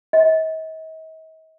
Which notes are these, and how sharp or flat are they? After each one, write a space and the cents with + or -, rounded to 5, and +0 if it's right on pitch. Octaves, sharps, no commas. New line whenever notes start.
D#5 +45